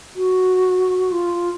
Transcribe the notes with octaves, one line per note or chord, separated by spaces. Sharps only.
F#4
F4